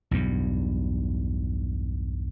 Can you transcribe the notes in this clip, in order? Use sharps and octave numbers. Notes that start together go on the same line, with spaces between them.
B1 E2 G2